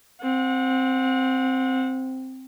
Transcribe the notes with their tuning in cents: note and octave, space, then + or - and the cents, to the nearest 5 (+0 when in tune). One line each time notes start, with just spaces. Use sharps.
C4 +0 F#5 -30